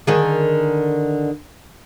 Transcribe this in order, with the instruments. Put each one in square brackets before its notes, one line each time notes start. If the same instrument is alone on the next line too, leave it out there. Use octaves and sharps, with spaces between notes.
[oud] D3 D#3 G#4